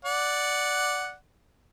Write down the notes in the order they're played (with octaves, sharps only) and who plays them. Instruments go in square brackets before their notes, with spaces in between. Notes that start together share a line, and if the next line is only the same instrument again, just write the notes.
[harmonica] D5 F#5